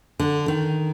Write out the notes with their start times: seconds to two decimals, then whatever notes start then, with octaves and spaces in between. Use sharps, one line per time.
0.19 D3
0.48 D#3